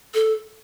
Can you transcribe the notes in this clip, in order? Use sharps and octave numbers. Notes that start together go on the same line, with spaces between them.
A4